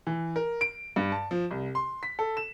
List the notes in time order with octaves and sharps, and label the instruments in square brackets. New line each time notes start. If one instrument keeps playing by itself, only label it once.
[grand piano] E3
A#4
D7
G2
A5
F3
C2
C6
B6
A4
E7